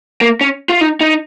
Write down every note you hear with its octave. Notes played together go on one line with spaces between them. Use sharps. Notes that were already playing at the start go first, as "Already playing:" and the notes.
A#3
C#4
F4
D#4
D#4